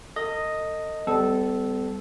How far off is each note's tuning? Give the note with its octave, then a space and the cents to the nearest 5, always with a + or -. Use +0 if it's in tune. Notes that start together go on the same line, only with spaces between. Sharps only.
A4 +45 D#5 +0
G3 +0 B3 +45 A4 -10